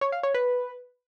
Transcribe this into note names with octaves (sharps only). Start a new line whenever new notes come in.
C#5
F5
C#5
B4